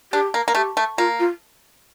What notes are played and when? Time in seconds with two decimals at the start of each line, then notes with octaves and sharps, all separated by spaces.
0.12 D4 G4
0.34 A#3
0.48 A#3
0.55 A3 G4
0.77 A3
0.98 A#3 F4
1.19 F4